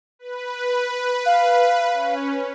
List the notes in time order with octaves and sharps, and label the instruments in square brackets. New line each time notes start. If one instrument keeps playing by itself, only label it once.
[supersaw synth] B4
[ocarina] F5
[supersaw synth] C#4